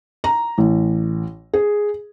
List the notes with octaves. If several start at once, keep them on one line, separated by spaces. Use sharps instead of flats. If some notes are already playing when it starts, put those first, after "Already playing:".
A#5
A1
G#4